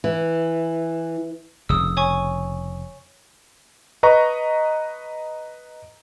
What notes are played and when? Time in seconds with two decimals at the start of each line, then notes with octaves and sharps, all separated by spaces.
0.04 E3
1.69 F1 C#3 D#6 E6
1.97 C#5 G#5 C#6
4.03 B4 D#5 A#5 C#6